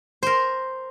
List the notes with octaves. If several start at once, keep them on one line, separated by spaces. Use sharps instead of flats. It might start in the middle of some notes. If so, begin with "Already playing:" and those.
A#4 C5